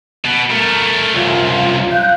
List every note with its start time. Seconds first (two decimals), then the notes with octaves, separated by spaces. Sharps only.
0.25 B2
0.51 A3 A#4
1.14 C2 F#2 F4
1.91 F5 F#6 G6